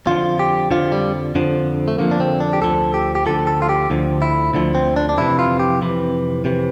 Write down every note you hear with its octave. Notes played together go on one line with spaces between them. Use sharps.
F2 D3 F3 F4
G4
F2 D3 F3 F4
G3
F2 D3 F3
A3
F2 D3 F3 A#3
D4
C4
D4
G4
D2 D3 F3 A4
G4
G4
D2 D3 F3 A4
A4
F4
G4
D2 D3 F3
E4
D2 D3 F3
C4
D4
D4
F2 C3 E3 E4
F4
G4
F2 C3 E3
F2 C3 E3